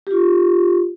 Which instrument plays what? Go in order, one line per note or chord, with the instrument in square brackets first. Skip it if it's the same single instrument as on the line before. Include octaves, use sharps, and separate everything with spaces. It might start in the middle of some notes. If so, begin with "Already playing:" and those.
[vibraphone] F4 G4